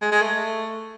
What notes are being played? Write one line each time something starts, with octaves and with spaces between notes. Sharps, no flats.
G#3
G#3
A3